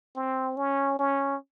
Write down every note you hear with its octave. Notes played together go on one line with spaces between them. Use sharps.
C4
C#4
C#4